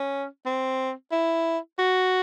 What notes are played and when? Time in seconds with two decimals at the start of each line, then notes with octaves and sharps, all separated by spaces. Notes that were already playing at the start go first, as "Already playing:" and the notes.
Already playing: C#4
0.46 C4
1.12 E4
1.79 F#4